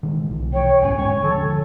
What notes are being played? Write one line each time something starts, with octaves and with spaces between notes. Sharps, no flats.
D#3 E3 G#3
B1 E3
C#5 G5
D2 G#2 C#4 C#5 G#5
E1 G#3 C#4 C#6
D#1 D3 F3 A4